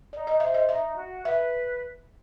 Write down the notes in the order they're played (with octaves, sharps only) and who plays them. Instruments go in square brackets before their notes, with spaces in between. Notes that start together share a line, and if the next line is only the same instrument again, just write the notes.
[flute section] D#4 [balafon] D5
[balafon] D#5
[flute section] C5 [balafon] E5
[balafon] D#5
[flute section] D#4 [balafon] E5
[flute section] F#4
[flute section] B4 [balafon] E5